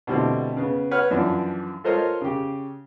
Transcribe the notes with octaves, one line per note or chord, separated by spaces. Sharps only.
B2 D3 G3 A3 C4 E4
C#3 B3
B4 C#5 F#5 F6
F#2 E3 F3 D4
F4 A4 A#4 C5 C#5 D#5
C#3 G4